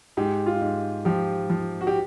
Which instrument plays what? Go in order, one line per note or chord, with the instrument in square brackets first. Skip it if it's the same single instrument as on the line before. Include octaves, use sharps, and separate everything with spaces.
[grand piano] G#2 G4
F4
G#2
F3 G4
F3
F#4
G4